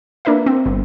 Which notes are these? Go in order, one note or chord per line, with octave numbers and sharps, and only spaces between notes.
A#3 D4 A#4 B4 E5
C4
G1